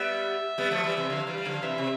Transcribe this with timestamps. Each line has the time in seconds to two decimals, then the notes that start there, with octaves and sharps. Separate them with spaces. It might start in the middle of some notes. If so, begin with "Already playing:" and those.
Already playing: G3 B3 E5
0.58 G3 B3
0.71 F3 A3
0.83 E3 G3
0.97 C3 E3
1.10 D3 F3 F5
1.27 E3 G3
1.38 G3
1.45 D3 F3
1.62 C3 E3 E5
1.78 C3